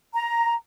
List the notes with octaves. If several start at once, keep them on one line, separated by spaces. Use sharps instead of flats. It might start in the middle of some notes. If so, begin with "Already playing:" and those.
A#5